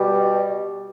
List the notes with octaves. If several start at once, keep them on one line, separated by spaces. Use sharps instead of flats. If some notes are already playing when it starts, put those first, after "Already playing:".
Already playing: B2 G3